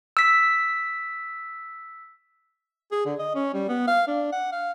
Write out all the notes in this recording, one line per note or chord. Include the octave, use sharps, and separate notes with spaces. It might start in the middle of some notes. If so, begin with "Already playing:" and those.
E6 B6
G#4
D3
D#5
C#4
G3
B3
F5
D4
F#5
F5